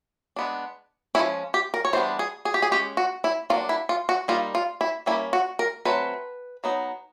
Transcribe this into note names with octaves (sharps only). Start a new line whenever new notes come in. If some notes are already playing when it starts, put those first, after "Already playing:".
G#3 B3 D4
F3 G#3 C#4 E4
G4
A#4
C#5
E3 G3 B3 D4 C5
G#4
G#4
G4
G#4
G#3 C#4 G4
F#4
E4
F#3 A#3 D4 F4
E4
F4
F#4
G3 A#3 D#4 F4
F4
E4
G3 A#3 C#4 E4
F#4
A#4
F#3 A3 C4 B4
F#3 B3 D#4